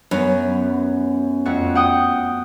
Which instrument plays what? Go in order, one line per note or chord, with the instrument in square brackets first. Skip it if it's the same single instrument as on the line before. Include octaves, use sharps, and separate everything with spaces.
[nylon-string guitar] F#2 [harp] B3
[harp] F2 A3 F#4
F#5 G5 D#6